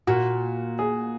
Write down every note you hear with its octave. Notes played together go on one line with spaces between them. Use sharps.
A#2 F#4
G#4